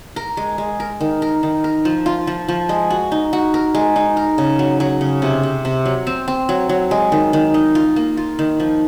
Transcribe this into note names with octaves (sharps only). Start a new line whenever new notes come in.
A#4
G#3
G#3
A#4
D#3
A#4
D#3
A#4
F3
F4
F3
F3
G#3
F#4
D#4
F#4
A#4
G#3
D#4
A#4
C#3
F#3
F#3
C#3
C3
C3
C3
F#3
C4
C4
F#3
F#3
G#3
D#3
D#3
D#4
F4
A#3
F4
D#3
F3